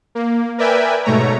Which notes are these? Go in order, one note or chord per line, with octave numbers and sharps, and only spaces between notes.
A#3
A#4 B4 D5 E5 G5 G#5
G#2 B2 A3 C#5 A#5